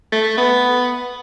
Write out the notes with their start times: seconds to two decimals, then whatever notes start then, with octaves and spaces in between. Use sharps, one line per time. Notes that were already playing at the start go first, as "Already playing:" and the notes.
0.12 A3
0.38 B3